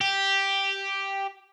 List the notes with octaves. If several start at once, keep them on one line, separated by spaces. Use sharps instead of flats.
G4